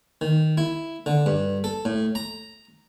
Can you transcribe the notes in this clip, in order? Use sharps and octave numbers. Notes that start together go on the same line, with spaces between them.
D#3
E4
D3
G2
A4
A2
A#5